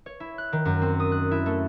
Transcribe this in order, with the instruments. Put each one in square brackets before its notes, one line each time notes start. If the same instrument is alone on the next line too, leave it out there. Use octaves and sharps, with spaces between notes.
[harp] C#5
E4
F#6
D#3
F#2
C4
D#6
F#6
E4
A3